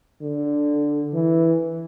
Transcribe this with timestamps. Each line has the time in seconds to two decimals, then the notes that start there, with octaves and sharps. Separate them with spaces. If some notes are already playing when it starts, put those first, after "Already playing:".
0.22 D3
1.13 E3